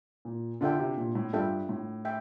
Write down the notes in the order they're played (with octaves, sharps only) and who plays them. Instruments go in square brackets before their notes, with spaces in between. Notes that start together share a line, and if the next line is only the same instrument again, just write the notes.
[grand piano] A#2
[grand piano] D3 [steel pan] D4 F4 A4 E5 G5
[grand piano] C3
A#2
A2
[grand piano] G2 [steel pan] D4 F4 A4 E5 G5
[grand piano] A2
[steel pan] E5 G5